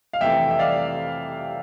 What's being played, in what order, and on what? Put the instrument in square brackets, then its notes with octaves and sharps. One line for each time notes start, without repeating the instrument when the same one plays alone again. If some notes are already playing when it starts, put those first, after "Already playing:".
[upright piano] F5
F2 C3 E3 A3 E5 G5
E5
D5 F5